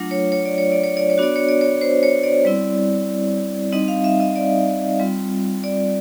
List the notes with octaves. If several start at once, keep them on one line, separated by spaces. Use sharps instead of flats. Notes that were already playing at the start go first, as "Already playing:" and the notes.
Already playing: F#3 A3 D4 F4
C#5
C#5
D5
C#5
D5
C#5
D5
C#5
B3 D4 F#4 D5
C#5
D5
C#5
C5
C#5
D5
G3 C4 E4
G3 C4 D#4 D#5
F5
E5
D#5
D5
G3 C4 F4
D5